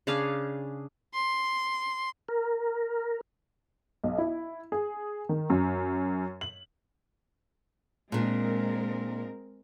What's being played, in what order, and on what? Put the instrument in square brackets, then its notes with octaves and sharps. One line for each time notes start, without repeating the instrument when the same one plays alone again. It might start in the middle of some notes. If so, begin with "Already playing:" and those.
[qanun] C#3 D4 G#4 F5
[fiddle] C6
[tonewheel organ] A#4
[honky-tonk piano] B1
E4
G#4
D#3
F#2
F#7
[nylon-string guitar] A#2 D4 [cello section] G#3 C4 A#4